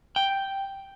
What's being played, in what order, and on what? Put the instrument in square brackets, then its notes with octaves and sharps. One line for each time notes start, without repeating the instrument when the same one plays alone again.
[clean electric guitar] G5